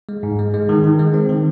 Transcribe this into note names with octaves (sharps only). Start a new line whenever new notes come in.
G#3
G#2
G#3
G#3
D#3
D#3
G#3
C4
D#3